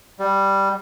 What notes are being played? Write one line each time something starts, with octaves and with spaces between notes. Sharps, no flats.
G3